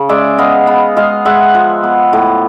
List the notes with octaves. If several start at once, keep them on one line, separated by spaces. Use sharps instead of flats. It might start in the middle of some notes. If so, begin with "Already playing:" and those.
Already playing: C#3
G#3 D5 E5
B3 D#5 F5
B3
G#3 D#5 F5
G#3 E5 F#5
F3
B3
A2